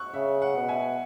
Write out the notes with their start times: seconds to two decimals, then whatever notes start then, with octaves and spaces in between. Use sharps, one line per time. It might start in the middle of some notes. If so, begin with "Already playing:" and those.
Already playing: F#5 C#6 E6 F#6
0.14 C#3 E5
0.42 F#5
0.55 B2
0.68 E5 G#5